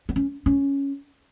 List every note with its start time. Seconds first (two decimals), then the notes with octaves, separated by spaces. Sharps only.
0.09 B3
0.16 C#4
0.46 C#4